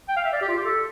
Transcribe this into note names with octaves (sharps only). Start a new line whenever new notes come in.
G5
F5
E5
D5
G4
F4
G4
A4